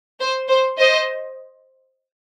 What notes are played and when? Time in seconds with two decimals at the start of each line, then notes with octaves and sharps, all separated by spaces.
0.20 C5
0.48 C5
0.78 C5 D#5